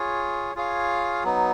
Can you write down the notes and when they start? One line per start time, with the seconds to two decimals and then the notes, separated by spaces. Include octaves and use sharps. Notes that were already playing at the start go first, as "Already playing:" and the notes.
Already playing: F4 G#4 C#5
0.55 F4 G#4 C#5 F5
1.24 F#3 B3 D#4